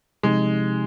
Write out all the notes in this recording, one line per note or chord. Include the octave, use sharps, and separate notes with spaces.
C3 F3 G#3 C4 D#4 G4